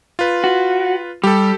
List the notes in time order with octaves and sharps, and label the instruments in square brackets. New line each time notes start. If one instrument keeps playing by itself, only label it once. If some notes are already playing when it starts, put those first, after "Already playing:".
[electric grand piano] F4 B4
[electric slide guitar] F#4
[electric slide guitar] G3 [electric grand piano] G4 A4